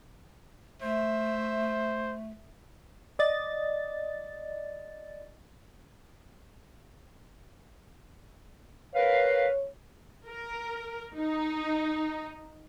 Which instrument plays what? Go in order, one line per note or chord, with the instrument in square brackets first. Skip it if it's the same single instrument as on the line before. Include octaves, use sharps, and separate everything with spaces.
[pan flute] A3 [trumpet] C5 [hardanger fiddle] E5
[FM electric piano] D5 D#5 A6
[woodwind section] A#4 B4 F5 [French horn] C#5
[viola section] A#4
D#4